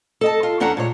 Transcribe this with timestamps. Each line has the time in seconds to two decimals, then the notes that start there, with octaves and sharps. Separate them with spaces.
0.21 A4 D#5 A5
0.43 F4
0.60 E2 C#4 D4 A4 F#5 A#5
0.77 A#2 G#3 C#5